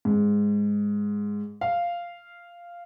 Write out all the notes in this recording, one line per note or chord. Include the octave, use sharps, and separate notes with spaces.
G#2
F5